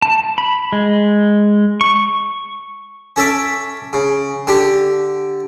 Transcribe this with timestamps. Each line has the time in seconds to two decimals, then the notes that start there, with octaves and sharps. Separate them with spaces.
0.02 A5
0.38 B5
0.72 G#3
1.81 C#6
3.16 C#4 A4 E5 D6
3.93 C#3
4.47 D3 G4